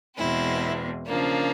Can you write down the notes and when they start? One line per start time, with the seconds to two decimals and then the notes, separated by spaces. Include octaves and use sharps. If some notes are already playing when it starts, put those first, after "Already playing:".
0.17 E2 B2 G#3 C4 E4
1.07 C#3 F3 A#3 D4